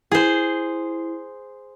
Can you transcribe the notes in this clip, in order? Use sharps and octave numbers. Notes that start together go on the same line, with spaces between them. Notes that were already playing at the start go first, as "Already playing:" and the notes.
E4 G#4 C5